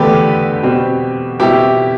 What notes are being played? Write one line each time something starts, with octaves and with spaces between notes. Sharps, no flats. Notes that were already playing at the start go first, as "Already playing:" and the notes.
Already playing: E2 D3 A3 G4 B4 D5
B2 G3 C4
B2 G3 C4 E4 G4